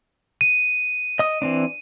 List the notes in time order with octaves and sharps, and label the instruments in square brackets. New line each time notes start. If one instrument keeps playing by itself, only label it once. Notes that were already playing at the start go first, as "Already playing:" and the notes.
[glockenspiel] D#7
[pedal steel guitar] D#5 D#6
E3 C4 D4